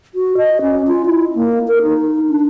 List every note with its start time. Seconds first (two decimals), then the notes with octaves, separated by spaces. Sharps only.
0.15 F#4
0.37 D#5
0.62 C#4
0.87 F4
1.06 E4
1.35 A#3
1.68 A#4
1.82 D#4
2.30 D4